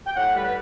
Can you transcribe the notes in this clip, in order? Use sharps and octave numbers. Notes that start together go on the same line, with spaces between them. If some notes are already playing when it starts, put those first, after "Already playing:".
G5
A2 F#5
G3 B4
B4